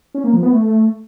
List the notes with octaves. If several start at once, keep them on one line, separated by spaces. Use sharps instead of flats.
C#4
A#3
F3
B3
A3